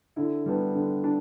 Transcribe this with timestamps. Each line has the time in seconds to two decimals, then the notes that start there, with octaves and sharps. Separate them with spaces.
0.16 D3 E4
0.46 G3 B3 D4
0.74 D3
1.04 D4